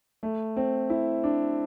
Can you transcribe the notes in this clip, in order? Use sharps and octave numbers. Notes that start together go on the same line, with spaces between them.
A3
C4
E4
D4